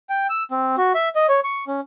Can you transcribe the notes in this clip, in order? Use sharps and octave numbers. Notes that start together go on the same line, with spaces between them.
G5
E6
C4
F#4
E5
D#5
C#5
C#6
C#4